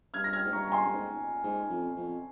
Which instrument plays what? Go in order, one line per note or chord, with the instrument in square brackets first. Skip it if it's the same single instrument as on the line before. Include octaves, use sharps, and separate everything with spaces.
[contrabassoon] G2 [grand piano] F6 G#6
[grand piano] A#6
F6 G#6
[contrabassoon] G#2
[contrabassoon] G2 [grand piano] A#5 C#6
[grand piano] A#5
G#5 C6
[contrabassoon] G2
G#2
G#2
F2
F2